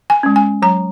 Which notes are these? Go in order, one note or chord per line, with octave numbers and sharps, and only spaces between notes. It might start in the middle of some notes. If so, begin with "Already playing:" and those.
G#5
G#3 C#4
G#5
F#3 A#5